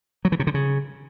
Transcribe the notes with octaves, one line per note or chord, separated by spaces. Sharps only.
F#3
E3
C3
D3
C#3